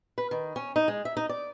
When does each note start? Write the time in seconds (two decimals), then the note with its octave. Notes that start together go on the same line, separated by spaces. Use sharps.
0.18 B4
0.31 D#3
0.56 C#4
0.76 D#4
0.88 G#3
1.05 E5
1.17 D#4
1.29 D5